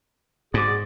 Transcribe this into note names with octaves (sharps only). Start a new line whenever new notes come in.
G#2 F#4 G#4 D5